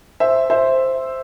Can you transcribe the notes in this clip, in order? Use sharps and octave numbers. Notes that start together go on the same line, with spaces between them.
C5 E5
C5 E5